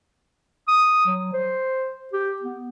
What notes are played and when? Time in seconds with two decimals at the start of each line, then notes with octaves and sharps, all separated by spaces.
0.68 D#6
1.06 F#3
1.33 C5
2.13 G4
2.42 B3